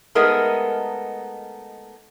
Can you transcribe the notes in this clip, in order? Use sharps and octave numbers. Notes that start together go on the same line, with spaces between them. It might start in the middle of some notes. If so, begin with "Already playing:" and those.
G#3 A3 B3 D#4 G#4 A#4